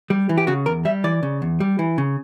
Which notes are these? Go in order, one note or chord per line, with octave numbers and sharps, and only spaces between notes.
G3
E3
G4
C#3 F#4
E2 A#4
G3 E5
E3 D5
C#3
E2
G3
E3
C#3